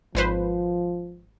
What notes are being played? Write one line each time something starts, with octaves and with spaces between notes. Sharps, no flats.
G#1 F3 B4 C5